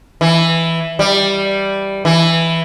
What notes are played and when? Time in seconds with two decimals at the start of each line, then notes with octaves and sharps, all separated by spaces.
0.21 E3
0.99 G3
2.05 E3